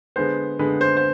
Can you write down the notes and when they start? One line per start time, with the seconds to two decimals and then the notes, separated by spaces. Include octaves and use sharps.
0.16 D3 G#3 B3 C5
0.59 D3 G#3 B3 B4
0.81 C5
0.97 C5